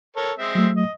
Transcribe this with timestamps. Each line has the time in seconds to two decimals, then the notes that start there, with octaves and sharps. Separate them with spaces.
0.17 A4 A#4 C#5
0.39 G#3 C4 E5
0.55 F#3 A3
0.77 D#5